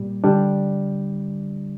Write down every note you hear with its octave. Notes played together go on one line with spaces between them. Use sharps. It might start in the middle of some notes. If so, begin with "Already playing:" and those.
Already playing: A#2 G3
D3 G3 D4